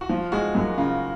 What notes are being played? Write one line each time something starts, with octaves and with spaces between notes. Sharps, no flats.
F#4
F3 F4
G#3 F#4
F#2
C#3 F4